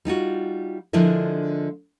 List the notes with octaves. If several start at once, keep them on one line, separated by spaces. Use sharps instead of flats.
G3 D#4 F4 F#4
D3 F3 G#3 D4 E4 A#4